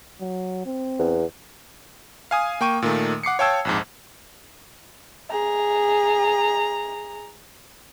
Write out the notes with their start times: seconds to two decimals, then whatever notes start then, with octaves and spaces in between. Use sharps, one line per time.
0.21 F#3
0.66 C4
0.99 E2
2.31 F5 G#5 D#6
2.61 A#3 G5 C#6 D#7
2.82 A#2 D#3 A3
3.23 F#5 D6 C7 C#7
3.39 C#5 F5 G5 A5 E6 G#6
3.65 A#1 F2 G#2
5.31 G#4 A#5